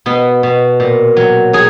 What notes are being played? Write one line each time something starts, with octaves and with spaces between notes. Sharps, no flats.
B2 B3
B2
A#2
F#3
F#3 G#4